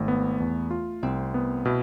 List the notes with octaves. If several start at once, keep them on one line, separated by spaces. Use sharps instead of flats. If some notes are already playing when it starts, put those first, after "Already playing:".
Already playing: G#1 A3
B3
E2
F4
C2 C4
B3
B2 E4